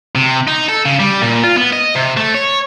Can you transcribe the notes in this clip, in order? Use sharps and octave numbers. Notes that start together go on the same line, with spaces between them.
C3
D#4
A4
C#3
G3
A#2
F4
B3
D#5
C3
A3
C#5